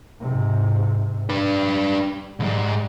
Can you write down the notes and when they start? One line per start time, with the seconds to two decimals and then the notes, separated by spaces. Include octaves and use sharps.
0.20 G#2 C3
1.30 G3 D4 B4
2.40 C2 G#2 G3